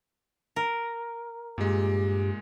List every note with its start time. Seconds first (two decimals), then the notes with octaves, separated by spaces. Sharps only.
0.56 A#4
1.58 G2 A#2 G#3 G4